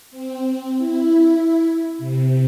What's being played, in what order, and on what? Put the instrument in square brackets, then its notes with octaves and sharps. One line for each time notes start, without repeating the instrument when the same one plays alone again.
[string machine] C4
E4
C3